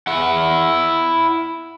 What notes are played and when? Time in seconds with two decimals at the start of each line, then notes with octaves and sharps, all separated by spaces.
0.07 E4 F#5